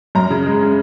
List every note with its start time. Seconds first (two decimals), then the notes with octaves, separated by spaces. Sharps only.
0.15 F#2 A#5
0.30 C#3
0.46 G#3
0.61 C#4